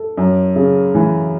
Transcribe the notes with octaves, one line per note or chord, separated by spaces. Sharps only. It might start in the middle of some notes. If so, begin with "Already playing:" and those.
Already playing: A4
F#2
C#3
E3